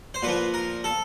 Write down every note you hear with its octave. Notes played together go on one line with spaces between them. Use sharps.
C5
A#2 F3 B4
A#4
A4